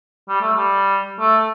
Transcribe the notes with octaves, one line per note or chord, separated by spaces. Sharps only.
G3
A3
G3
A3